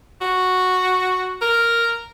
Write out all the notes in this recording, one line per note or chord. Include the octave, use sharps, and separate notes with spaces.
F#4
A#4